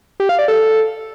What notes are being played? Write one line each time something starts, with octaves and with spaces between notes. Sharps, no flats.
G4
F5
D5
A4